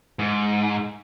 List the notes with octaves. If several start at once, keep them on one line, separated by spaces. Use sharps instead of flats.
G#2